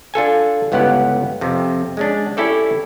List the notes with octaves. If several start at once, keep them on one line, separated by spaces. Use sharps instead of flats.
D4 F4 A4 G#5
G1 C#2 B3 E4 G4 F#5
F2 C3
G#3 C#4 D4
C#4 E4 G4 A4 C#5 D5